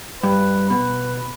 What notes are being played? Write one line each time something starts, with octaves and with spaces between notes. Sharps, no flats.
G2 B4
B2 B4